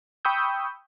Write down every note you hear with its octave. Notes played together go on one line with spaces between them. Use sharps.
G5 B5 C#6 D#6 E6 G6